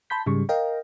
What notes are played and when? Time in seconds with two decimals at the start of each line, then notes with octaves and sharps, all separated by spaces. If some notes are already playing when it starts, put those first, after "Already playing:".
0.10 A5 B5 C6 G6 B6
0.26 G#2 C#3 G3 G#3 C#6
0.49 A#4 D#5 F5 G5 A#5